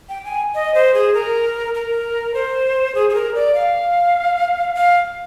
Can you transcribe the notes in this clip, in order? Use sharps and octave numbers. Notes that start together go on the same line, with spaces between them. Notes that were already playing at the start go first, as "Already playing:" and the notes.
G5
G#5
D#5
C5
G#4
A#4
A#4
C5
G#4
G#4
A#4
D5
F5
F5